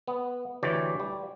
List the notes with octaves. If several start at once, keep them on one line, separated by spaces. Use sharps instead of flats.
B3
D2 E3 G4 C#5 D5 G5
G3